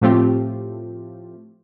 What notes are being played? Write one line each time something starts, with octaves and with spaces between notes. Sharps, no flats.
A2 F3 A3 C4 F4 G4